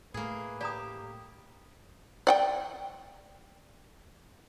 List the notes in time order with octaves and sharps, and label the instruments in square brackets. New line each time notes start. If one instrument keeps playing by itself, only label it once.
[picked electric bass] A2 A3 [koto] A#3 G#4 [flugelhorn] B4
[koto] G4 [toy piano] D5 A#5 D#6
[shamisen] D5 F#5 G5